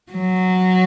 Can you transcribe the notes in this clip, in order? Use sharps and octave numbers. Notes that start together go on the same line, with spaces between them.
F#3